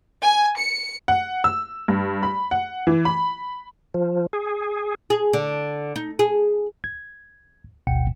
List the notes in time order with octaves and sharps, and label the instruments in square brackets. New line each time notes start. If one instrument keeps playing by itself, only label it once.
[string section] G#5
C#7
[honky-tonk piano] F#5
E6
G2
B5
F#5
E3
B5
[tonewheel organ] F3
G#4
[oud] G#4
D3
D#4
G#4
[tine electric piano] G#6
G#1 D2 B2 F#5 G5 C#7